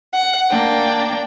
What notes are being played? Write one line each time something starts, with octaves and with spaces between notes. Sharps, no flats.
F#5
A#3 D4 G5